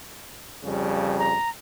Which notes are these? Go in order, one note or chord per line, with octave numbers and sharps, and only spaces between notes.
F2 C#3 G3
A#5